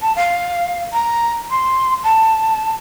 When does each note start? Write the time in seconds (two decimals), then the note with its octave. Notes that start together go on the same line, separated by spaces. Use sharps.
0.01 A5
0.16 F5
0.93 A#5
1.50 C6
2.04 A5